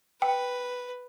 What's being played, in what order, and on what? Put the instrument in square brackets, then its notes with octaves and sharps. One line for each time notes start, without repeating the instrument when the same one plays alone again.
[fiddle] B4 [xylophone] G5